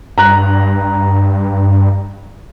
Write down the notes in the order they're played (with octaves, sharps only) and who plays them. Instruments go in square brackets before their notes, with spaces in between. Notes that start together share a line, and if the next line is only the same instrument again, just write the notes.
[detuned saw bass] G2 [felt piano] A#5 F#6